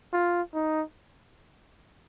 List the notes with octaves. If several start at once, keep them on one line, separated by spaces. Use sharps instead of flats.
F4
D#4